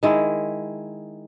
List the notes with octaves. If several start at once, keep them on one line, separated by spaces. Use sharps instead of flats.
D#3 G#3 E4